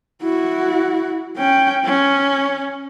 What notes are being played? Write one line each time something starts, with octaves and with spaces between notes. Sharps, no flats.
E4 F#4
C#4 G5
C#4